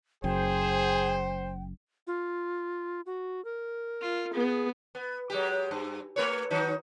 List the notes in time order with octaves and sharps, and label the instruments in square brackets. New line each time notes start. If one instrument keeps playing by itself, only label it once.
[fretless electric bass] F#1 F#2 [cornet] G#4 [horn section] C5 [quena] G5
[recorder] F4
F#4
A#4
[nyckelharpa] F4
[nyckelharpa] B3 [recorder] G#4
[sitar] B3
F#3 G#3 G4
G2
A3 B4 C#5
D#3 F#3 D#4